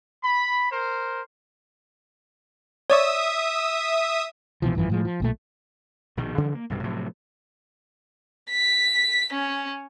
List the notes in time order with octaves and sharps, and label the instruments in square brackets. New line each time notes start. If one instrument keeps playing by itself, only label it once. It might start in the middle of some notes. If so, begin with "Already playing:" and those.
[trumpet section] B5
A#4 C5
[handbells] C#5 D5 C#6 [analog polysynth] E5 D#6
[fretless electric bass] D1 B2 E3 F3
G#1 F#2 E3 F3
A2 F3 G#3
F3
B1 A#2 A3
[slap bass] A#1 B2 D#3
C#3 E3 F3 G3
A#3
B1 G2 C3
A2 C3 F3 F#3
[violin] B6
C#4